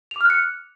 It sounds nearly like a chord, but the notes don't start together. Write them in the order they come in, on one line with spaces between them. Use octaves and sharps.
F7 D6 F6 F#6 C#7